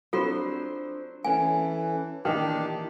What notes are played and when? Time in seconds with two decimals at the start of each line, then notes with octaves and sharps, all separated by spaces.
0.13 F#3 C4 D4 F4 A4 C5
1.25 E3 B3 C#4 A4 G#5
2.25 A#2 D#3 E3 D4 D#4 G4